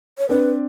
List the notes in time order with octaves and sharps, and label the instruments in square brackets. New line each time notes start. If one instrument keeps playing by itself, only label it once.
[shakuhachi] C#5
[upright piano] C4 D4 [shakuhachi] B4